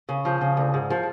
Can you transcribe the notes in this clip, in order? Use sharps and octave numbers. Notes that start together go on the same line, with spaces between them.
C#3
F3
C#3
D2
G#2
F3